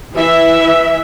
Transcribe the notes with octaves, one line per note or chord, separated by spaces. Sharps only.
E3 E5